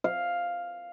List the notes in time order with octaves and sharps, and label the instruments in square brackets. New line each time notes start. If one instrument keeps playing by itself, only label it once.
[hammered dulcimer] F5